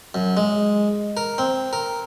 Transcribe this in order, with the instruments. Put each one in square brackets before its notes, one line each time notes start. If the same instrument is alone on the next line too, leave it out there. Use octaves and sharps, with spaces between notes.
[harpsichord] F#2
G#3
A#4
C4
A#4